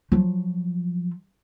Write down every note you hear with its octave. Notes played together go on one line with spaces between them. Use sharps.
F3 F#3